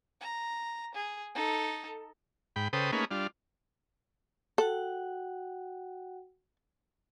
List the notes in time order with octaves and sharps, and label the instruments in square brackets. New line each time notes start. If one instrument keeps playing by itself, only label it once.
[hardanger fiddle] A#5
G#4
D#4 A4
[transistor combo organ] G#2 G5 B5
C#3 A4 B4 C5 G5 D#6
A3 A#3 C#4 D#4 G#4 B4
G3 D4 F4
[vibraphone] F#4 F#5 G5 [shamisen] A4